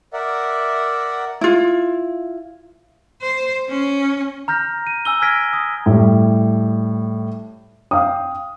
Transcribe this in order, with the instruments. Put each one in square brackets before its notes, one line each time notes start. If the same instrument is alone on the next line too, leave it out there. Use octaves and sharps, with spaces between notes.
[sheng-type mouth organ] A#4 D5 E5 F#5
[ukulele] E4 F4
[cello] C5
C#4
[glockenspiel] A#5 F6 G6 A#6
D#7
G#5 E6 G7
E6 F6 G#6 A#6 B6 D7
D#6
[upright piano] A2 G3
F5 G5 D#6